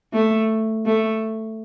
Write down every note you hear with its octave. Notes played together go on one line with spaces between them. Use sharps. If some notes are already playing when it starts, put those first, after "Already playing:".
A3
A3